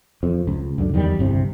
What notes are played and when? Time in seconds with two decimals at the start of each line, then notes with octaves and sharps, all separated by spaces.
0.23 F2
0.47 C#2
0.78 C#2 F#2 D3
0.94 E2 D#3 F#3 G3
1.19 G1 C2 C3